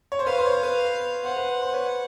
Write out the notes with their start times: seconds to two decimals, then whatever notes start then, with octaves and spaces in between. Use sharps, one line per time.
0.12 C#5
0.19 C5
0.26 B4 F5
0.38 C5
0.46 C#5
0.51 C5
0.63 B4
0.85 B4
1.24 C5 F#5
1.37 B4
1.48 C5
1.62 C5
1.73 B4 C#5